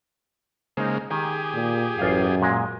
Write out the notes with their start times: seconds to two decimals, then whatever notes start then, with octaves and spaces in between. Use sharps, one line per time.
0.77 C#3 G#3 A#3 D#4 C5
1.10 D#3 G4 G#4
1.53 A#2
1.98 A1 F#2 F4 F5
2.42 A#2 G#3